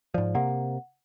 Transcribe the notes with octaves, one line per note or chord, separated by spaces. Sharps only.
G#2 F3 D5
C3 A#3 F#5